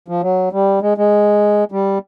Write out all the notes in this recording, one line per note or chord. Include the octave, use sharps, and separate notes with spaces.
F3
F#3
G3
G#3
G#3
G3